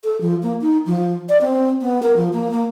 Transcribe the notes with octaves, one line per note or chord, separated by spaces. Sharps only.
A4
F3
A#3
D#4
F3
D5
C4
B3
A#4
F3
A#3
A#3